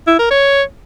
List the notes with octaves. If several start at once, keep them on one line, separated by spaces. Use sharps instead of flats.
E4
A#4
C#5